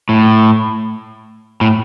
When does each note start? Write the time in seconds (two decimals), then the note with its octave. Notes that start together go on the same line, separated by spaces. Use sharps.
0.09 A2
1.61 A2